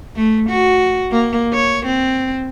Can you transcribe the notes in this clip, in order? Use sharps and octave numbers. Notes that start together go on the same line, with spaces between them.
A3
F#4
A#3
C#5
C4